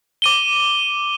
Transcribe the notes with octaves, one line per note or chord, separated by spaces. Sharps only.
D6 D#7 G7